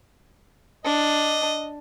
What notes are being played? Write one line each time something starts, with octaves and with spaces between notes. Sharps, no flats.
D4 D#5